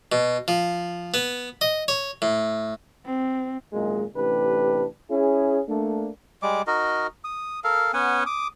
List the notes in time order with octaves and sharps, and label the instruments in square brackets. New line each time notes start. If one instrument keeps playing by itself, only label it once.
[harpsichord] B2
F3
B3
D#5
C#5
A2
[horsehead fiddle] C4
[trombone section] G#1 F#2 A#2 G#3
A1 C3 D4 G4 B4
C#4 E4 G#4
A3 A#3 D4
[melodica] G3 G#3 D6
D#4 F#4 A#4 D#5
D#6
A4 A#4 F5
B3 C#4 F#5 G#5
D6 D#6